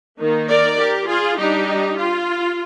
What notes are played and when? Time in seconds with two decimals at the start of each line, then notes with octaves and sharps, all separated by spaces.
0.19 D#3 A#3 D#4
0.48 A#4 D5
0.78 G4 A#4
1.08 F4 G#4
1.37 G3 D4 D#4 G4
1.98 F4